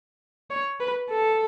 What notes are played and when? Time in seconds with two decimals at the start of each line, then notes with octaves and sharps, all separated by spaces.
0.50 C#5
0.80 B4
1.10 A4